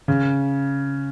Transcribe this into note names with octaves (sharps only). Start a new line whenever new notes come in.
C#3